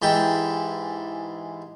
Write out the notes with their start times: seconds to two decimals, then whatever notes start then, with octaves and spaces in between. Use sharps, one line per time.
0.02 G#2 E3 G4 A5